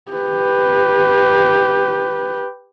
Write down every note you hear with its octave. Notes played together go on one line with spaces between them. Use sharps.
G4 B4